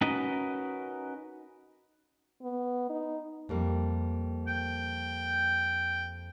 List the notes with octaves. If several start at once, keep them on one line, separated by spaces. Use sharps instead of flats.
C#4 D#4 F#4 A#4 B4 D#5
B3
D#4
F2 G3 A#3
G5